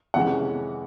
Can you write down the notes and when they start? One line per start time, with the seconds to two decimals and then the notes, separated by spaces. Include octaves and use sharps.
0.14 F2 C3 E3 G#3 C#4 F#5